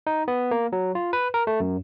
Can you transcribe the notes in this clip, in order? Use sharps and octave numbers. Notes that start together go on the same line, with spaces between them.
D#4
B3
A#3
F#3
F4
B4
A#4
A3
F#2